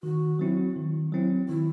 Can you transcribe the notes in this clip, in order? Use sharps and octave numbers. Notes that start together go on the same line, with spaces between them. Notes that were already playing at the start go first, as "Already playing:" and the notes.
D#3 F#4
F#3 C4 E4
D#3
F#3 C4 E4
D#3 E4